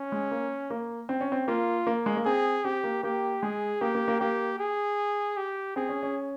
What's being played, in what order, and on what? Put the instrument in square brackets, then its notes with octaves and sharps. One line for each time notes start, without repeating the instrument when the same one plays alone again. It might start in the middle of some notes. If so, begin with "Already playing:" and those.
Already playing: [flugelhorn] C#4
[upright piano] G#3
A#3
A#3
C4
C#4
C4
[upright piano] A#3 [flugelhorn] F4
[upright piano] A#3
G#3
A#3
[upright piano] C4 [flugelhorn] G#4
[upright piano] C4 [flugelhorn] G4
[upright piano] A#3
[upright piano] A#3 [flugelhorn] G4
[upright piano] G#3 [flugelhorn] G#4
[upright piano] A#3 [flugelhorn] G4
[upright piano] A#3
A#3
[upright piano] A#3 [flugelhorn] G4
[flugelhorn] G#4
G4
[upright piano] C4 [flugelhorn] G#4
[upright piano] C#4
C#4